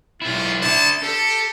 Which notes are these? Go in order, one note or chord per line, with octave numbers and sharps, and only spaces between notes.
B1 E4 F4
D4 E5 A5
G4 A4